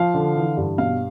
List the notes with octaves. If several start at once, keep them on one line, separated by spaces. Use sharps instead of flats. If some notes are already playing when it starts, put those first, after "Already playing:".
Already playing: F3 F5
D3
E3
G2
B2 F5